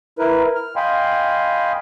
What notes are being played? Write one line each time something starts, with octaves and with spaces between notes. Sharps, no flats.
E4 A#4 B4
F6
D#5 F5 G5 G#5 B5 C6